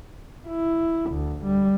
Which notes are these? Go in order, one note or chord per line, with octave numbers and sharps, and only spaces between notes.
E4
D2
G3